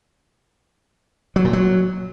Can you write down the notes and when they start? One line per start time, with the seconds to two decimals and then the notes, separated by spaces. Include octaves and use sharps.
1.36 F#3
1.45 A#2
1.53 F#3